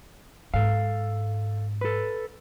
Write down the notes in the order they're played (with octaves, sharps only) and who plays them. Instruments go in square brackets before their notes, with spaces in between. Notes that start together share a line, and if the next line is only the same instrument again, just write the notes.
[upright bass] G#2 [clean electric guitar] A4 F5
[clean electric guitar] A4 B4